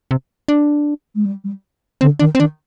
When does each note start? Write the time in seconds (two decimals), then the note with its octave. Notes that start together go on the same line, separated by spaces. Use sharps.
0.11 C3
0.48 D4
1.15 G#3
1.25 G3
1.44 G3
2.01 D3 C4
2.19 D#3 D4
2.35 C4
2.39 D#3 D4